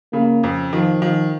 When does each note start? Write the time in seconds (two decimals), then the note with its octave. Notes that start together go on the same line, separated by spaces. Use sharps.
0.13 C#3 A#3
0.43 F2
0.73 D#3 F3
1.02 D#3 F3